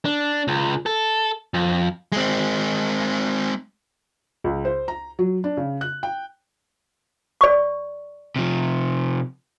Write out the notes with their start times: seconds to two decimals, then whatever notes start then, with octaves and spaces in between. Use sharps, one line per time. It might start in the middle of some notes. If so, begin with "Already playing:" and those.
0.05 D4
0.48 C#2
0.86 A4
1.54 F2
2.12 G#3 C4
4.44 C#2
4.65 C5
4.88 A#5
5.19 F#3
5.44 D4
5.57 C#3
5.81 F#6
6.03 G5
7.41 D5 C#6
8.36 C3 F3